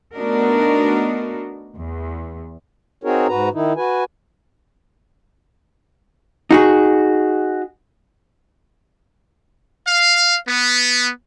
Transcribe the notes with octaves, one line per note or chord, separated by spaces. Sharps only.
A3 B3 D4 D#4 F#4 A#4
E2
C4 D#4 F#4 G#4 A#4 C#5
G#2 F#4 B4 A#5
D#3 D#4 E4
F#4 B4 G#5
D#4 F#4 G#4
F5
B3